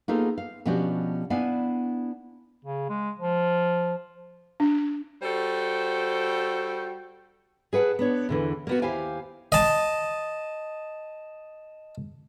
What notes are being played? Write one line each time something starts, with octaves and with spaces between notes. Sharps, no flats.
A#3 B3 D#4 F4 G#4 A4
F5
B2 F3 C#4 D4 F#4 G4
B3 D4 E4 D5 F5 G#5
C#3
G#3
F3
D4
G3 F#4 A4 C5 G5
G#4 B4 F#5 A5
B3 D4 C#5
E2 D3 E3
A#3 B3 F#4
D#2 E4 G4 C5 F5 G#5
D#5 A5